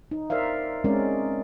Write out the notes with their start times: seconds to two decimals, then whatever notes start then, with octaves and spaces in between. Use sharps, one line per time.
0.11 D#4
0.30 A#4 C5 D5 E5 F5
0.84 G#3 C4 C#4 A#4 D5